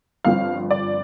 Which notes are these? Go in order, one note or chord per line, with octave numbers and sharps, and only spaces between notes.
G1 G2 F3 C4 F5
D5